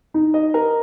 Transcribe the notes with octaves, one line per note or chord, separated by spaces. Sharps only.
D#4
D#5
A#4